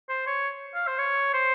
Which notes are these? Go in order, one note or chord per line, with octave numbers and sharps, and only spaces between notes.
C5
C#5
F5
C5
C#5
C5